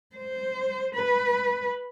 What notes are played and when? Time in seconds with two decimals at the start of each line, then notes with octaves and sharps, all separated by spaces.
0.16 C5
0.95 B4